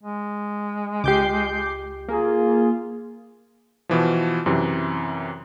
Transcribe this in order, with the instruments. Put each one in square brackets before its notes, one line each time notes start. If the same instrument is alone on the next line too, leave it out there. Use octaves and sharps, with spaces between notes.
[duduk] G#3
[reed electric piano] C#2 G4 [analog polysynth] D6 G6 C7
[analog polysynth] A#3 [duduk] F4 [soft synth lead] G#4
[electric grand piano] B2 E3 F3
F#2 C3 E3